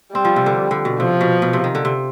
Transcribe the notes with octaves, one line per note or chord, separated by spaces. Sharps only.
G3 C4
F3
C3
D3
D3
B2
C3 F3
B2
B2
C3
D#3
D3
C3